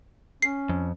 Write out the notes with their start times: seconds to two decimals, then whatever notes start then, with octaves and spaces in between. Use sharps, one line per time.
0.42 C#4 C7
0.69 F2